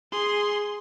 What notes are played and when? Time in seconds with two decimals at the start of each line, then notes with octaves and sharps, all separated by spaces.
0.11 G#4 C6